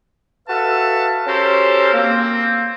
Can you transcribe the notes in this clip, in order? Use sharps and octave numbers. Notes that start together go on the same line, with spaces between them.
F#4 A4 B4 E5 F5 A5
C#4 F#4 G4 A4 A#4 C5
A#3 C4